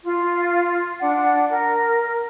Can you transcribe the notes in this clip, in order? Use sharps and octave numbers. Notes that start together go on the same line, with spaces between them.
F4
D4 F#5
A#4